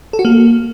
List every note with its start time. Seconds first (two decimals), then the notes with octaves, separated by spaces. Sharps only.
0.13 A4
0.19 F#4
0.25 A#3